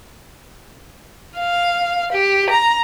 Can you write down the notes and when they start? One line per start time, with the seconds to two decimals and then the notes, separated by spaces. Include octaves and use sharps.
1.38 F5
2.13 G4
2.50 A#5